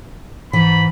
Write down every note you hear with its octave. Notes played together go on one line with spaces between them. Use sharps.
G#2 E3 B5